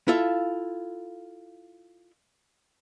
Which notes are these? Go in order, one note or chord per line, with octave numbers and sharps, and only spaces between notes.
E4 F4 A4 E5